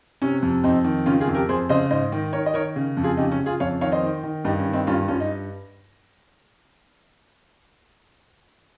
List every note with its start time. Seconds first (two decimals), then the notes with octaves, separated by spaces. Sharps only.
0.22 C3 C#4
0.43 F2
0.64 F2 C4 D#4
0.85 D#3
1.06 C#3 C#4 F4
1.21 F4 G#4
1.27 F2
1.34 G4 A#4
1.49 F2 G#4 C5
1.69 C#3 C5 D#5
1.91 G#2 C5 D#5
2.12 D#3
2.33 D#3 A#4 C#5
2.46 D#5
2.54 D#3 A#4 C#5
2.76 C#3
2.97 F2
3.03 F4 G#4
3.17 C#3 D#4 G4
3.32 C#4
3.40 C#3
3.46 F4 G#4
3.60 F2 C#5 F5
3.81 D#3 C#5 F5
3.92 C5 D#5
4.03 D#3
4.23 D#3
4.45 G2 D#4 G4
4.59 C#4
4.66 D#3
4.73 C4 D#4
4.87 G2 C#4 F4
5.08 G2 C#4 F4
5.20 D#4